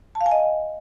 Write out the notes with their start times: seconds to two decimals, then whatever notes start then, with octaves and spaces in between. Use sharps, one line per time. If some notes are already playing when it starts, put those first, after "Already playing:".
0.15 A5
0.21 F5
0.26 G#5
0.31 D#5